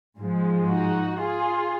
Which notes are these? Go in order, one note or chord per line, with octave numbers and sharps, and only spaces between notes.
G#2 F3 G#3
D#4 F#4
F4 G#4